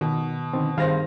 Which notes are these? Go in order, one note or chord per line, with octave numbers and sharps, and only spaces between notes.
B2 D#3
D3 D#3 C4
G2 D#3 C4 G#4 C5 F5 A#6